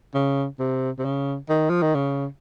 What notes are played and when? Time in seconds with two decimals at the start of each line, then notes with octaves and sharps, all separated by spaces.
0.14 C#3
0.59 C3
0.98 C3
1.05 C#3
1.49 D#3
1.70 F3
1.82 D#3
1.95 C#3